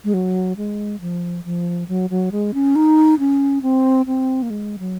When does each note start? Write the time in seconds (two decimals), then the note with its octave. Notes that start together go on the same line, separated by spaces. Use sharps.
0.04 G#3
0.14 F#3
0.57 G#3
1.01 F3
1.45 F3
1.88 F#3
2.10 F#3
2.32 G#3
2.54 C#4
2.76 D#4
3.19 C#4
3.62 C4
4.07 C4
4.42 A#3
4.50 G#3
4.79 F#3